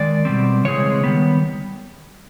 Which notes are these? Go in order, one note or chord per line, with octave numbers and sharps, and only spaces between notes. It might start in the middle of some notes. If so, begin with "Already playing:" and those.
Already playing: D#3 G#3 D5
B2 G3 C4
C#3 E3 G#3 C4 C#5
D#3 G3 B3